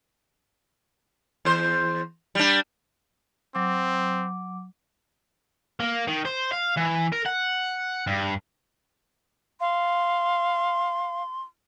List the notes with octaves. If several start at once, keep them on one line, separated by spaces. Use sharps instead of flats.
E2 C5
G3 D4
F#3 C4 D6
A#3
D#3
C5
F5
E3
A#4
F#5
G2
F5 C6